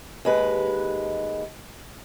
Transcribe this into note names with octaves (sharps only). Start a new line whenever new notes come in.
D#2 G#3 B4